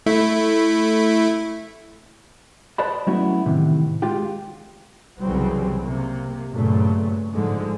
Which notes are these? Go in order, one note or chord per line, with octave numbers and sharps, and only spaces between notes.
A3 E4
B4 C5 D5 D#5 A5 B5
F#3 A3 B3 C#4 E4 F#4
A2 C3 D#3 E3
G#3 F4 G4
C2 C#3 E3 F#3 G3 C4
C3 A#3
G2 A#2 C#3 F#3 A3
G#2 D3 F3 G#3